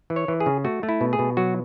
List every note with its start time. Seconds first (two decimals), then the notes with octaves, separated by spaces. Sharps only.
0.10 E3
0.16 C#5
0.28 E3
0.40 G#4
0.46 C#3
0.65 A3 F#4
0.83 A3
0.89 E4
1.01 B2
1.13 G#4
1.19 B2
1.37 F#3 F#4